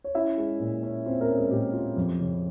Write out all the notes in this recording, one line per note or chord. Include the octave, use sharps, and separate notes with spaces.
C#5
C#4 E4 E5
G#3
A#2
C#4
C4 F4 C5
A#3 A#4
C#4
G#3 G#4
A#2 G4
F4
F2
C#3